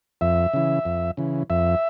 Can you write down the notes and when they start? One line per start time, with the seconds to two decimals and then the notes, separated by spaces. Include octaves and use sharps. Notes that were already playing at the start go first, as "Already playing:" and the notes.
0.21 F2 E5
0.53 C#3 E3
0.85 F2
1.17 C#3 E3
1.50 F2 E5